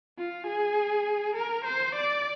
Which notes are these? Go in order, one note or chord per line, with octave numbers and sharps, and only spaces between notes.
F4
G#4
A#4
C5
D5